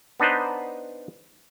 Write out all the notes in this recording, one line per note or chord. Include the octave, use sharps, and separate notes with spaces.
B3 D4 D#4 B4 C5